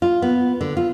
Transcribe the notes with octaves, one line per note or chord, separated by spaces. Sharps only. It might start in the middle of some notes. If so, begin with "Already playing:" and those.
F4
B3
D3
F4